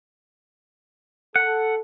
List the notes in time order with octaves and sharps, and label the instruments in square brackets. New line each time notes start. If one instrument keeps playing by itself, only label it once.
[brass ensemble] A4 [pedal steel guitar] F#5